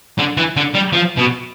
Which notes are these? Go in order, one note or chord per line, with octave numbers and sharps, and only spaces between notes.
D3
E3
D3
G3
F3
B2